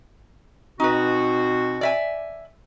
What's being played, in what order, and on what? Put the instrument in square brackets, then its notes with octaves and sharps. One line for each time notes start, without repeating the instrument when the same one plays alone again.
[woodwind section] B2 C4 F#4 [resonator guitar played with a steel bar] D#4 B4
[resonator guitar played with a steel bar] D5 E5 G#5